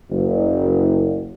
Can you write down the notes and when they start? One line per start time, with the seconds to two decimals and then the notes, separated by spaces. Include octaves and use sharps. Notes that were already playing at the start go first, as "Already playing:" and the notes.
0.10 F#1